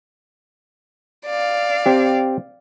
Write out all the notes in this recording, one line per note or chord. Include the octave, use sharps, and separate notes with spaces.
D5 F5
C4 G4